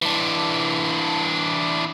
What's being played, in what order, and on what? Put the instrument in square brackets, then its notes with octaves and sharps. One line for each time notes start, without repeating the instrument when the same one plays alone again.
[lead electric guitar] E3 D4